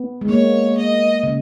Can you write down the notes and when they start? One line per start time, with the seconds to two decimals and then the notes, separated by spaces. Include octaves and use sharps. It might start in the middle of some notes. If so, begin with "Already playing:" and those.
Already playing: B3
0.21 G#3
0.29 A#3 C#5
0.77 D#5
1.23 C#3